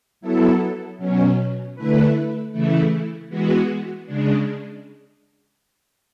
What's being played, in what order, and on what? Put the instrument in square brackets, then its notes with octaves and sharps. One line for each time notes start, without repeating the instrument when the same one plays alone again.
[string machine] F#3 B3 E4 A4
B2 F#3 C#4
D3 A3 E4 B4
C#3 E3 A3 E4
E3 G#3 B3 F#4
C#3 G#3 D4